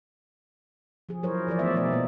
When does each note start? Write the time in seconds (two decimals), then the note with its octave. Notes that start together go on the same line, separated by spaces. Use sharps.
1.09 F3 G#4
1.23 F#3 E4 A#4 C5 C#5
1.47 E3 F3 G#4 D5
1.59 E3 A3 B3 D5 E5
1.74 B2 F3 D#4 D5
1.92 A#2 G#3 A#3 B3